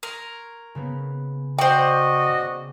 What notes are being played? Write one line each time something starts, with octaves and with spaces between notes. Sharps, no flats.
A#4 C6 C#6 G#6
C#3 A#3 B3
F#4 C5 D5 D#5 G5
C#3